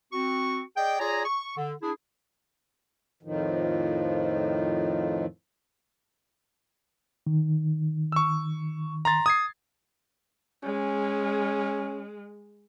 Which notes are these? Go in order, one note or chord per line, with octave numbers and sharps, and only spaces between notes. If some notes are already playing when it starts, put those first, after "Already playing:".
C4 F#4 C#6
G#4 D5 D#5 G5
F4 G#4 C#5 D5 G#5 A#5
C#6
D3
D4 E4 G#4
F2 A2 D#3 F3
D#3
C#6 E6
A#5 C6 A6
D#6 G#6 C7
G#3 C#4